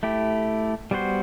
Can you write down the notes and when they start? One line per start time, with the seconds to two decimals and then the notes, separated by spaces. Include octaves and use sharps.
0.03 A3 E4 G4
0.91 G3 B3 F#4 C5